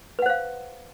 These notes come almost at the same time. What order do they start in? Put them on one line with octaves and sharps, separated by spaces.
B4 F#5 C5 F5